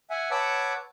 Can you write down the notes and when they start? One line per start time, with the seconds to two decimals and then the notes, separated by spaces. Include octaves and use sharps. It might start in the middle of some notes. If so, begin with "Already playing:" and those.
0.10 E5 F#5 G#5
0.31 B4 C#5 F#5 A5 D6 E6